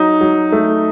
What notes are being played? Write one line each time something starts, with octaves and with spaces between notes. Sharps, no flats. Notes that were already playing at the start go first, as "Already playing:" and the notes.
Already playing: F#3 D#4
F#3
A3